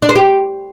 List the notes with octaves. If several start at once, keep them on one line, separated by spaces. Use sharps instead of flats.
D4
C5
G4